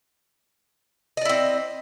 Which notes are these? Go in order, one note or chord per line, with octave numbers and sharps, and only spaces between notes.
C4 E4 D5 D#5